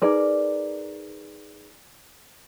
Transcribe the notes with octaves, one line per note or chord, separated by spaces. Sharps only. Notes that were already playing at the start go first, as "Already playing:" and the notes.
D#4 G#4 A#4 B4 D5